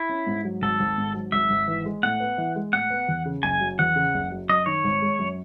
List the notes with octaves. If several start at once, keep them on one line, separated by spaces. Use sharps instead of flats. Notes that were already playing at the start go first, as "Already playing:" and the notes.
Already playing: E4
C#4
G#2
F#3
G#1 A4
G#1
G#2
F#3
G#1 E5
G#1
E3
G#3
A2 F#5
B3
E3
G#3
A2 F#5
B3
E2
C#3
F#1 G#5
F#3
E2 F#5
C#3
F#1
F#3
F#2 D#5
D#3 C#5
G#1
G#3
F#2